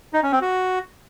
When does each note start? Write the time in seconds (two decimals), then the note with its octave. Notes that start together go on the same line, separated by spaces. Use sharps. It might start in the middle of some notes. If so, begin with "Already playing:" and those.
0.13 D#4
0.23 C#4
0.32 C4
0.41 F#4